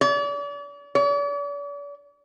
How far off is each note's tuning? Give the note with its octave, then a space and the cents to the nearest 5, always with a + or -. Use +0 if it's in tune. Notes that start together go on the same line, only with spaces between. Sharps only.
D5 -40
D5 -45